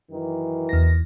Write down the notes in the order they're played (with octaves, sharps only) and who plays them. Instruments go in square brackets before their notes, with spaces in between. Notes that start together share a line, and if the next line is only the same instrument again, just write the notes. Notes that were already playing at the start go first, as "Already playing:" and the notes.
[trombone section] F#2 D#3 E3
[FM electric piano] E2 A#6